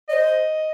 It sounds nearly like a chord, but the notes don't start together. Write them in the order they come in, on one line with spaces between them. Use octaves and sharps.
D5 D#5 C5